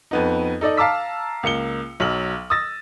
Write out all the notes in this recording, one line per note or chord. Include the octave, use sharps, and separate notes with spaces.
F2 B3 D#4
D#4 A4 D5 D#5
F5 A5 A#5 D6 E6 B6
C#2 A#3 C#7 G7
B1 F#3 F6 F#7
D#6 E6 A6 A#6